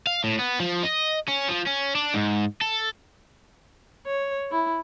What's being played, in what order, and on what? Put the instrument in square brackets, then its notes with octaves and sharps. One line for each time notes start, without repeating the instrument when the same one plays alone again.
[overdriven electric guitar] F5
A2
B3
F3
D#5
C#4
F3
C#4
D4
G#2
A4
[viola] C#5
E4